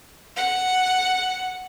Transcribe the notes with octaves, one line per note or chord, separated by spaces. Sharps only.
F#5